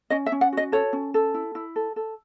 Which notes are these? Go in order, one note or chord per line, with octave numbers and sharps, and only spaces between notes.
C#4 D#5
E5
C#4
F#5
F#4 D#5
A4 C#5
C#4
A4
E4
E4
A4
A4